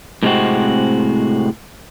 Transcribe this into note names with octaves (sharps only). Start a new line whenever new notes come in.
A2 C3 G#3 C4 F#4